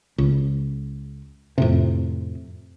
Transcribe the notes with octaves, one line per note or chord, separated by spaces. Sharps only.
C#2
F2 A2 C3